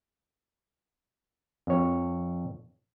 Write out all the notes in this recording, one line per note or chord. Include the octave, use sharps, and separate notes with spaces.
F2 C#5